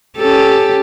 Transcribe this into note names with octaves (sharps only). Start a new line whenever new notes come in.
C#4 G4 A4